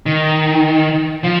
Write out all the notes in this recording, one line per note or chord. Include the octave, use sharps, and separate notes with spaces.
D#3
F3